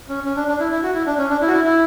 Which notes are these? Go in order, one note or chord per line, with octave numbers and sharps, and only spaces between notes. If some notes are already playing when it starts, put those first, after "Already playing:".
C#4
C#4
D4
D4
E4
E4
F#4
E4
D4
C#4
D4
E4
F#4
E4
E4